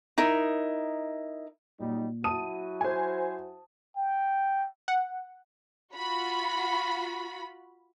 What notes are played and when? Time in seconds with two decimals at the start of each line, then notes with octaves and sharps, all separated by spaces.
0.18 D#4 E4 A#4
1.80 A#2 F#3 G3 D#4
2.24 F#3 E4 F#4 A5 D#6 D#7
2.81 C5 G#5
3.96 G5
4.88 F#5
5.94 F4 F#4 B5